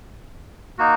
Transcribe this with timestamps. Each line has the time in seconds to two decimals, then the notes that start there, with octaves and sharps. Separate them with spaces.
0.78 A#3 D#4 F#4